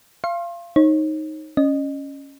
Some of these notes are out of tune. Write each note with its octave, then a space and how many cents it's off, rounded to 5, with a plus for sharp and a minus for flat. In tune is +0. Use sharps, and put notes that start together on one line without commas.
F5 -25 C6 +35
D#4 +0 C#5 -35
C#4 +0 D#5 -25